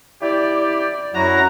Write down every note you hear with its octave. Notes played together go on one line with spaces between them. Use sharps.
E4 G4 D5
F#2 F#3 E4 F#4 A#5